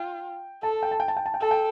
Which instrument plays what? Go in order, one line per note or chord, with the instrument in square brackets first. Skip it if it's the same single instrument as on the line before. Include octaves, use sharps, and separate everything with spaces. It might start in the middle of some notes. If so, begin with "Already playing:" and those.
Already playing: [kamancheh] F4 [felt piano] G5
[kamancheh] A4 [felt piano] A5
[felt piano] G5
A5
G5
A5
G5
A5
G5
[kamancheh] A4 [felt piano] A5
[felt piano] G5